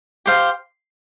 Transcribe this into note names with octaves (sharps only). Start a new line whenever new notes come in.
G4 C5 F5